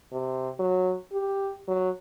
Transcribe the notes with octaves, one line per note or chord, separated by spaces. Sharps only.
C3
F#3
G4
F#3